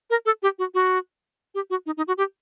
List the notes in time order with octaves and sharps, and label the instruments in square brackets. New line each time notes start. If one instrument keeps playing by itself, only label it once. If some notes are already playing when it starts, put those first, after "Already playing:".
[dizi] A#4
A4
G4
F#4
F#4
G4
F#4
D#4
D#4
F#4
G4